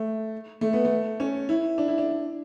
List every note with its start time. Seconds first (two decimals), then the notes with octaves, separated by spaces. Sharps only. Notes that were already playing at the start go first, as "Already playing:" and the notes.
Already playing: A3
0.61 A3
0.73 B3
0.85 A3
1.20 C#4
1.49 E4
1.78 D4
1.88 E4
1.98 D4